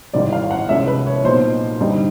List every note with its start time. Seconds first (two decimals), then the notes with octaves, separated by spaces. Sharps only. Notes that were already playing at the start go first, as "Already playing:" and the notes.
0.13 G#1 G#2 E3 G3 D5
0.33 F5
0.51 F#5
0.69 C2 C3 F3 G#3 C#4 E5
0.88 B4
1.06 C#5
1.24 B1 A#2 F#3 B3 D#4 C5
1.80 G2 D3 G3 C4 D#4